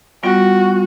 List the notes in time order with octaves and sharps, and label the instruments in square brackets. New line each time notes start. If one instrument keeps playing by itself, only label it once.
[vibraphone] G3 B3 F4 [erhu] F#4